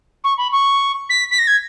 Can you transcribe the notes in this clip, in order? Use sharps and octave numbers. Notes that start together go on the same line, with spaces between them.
C#6
B5
C#6
B6
B6
A#6
G#6